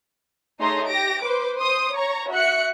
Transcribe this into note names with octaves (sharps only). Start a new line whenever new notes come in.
A3 D#4 G#4 C#5 A#5 C6
G4 A#6 D7
B4 C5 D6
C5 C6 D#6
C#5 A#5 C#6
F#4 E5 F#6 C#7